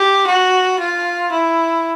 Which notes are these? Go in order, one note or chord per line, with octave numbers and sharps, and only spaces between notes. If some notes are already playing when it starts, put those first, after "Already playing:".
Already playing: G4
F#4
F4
E4